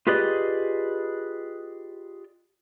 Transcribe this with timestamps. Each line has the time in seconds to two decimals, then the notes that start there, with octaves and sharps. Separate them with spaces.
0.07 F4 G4 G#4 B4 D5 D#5